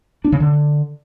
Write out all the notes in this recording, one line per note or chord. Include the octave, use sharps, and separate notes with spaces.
D4
C#3
D3